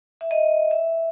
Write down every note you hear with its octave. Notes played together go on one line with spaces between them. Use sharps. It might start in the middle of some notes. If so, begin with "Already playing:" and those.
E5
D#5
E5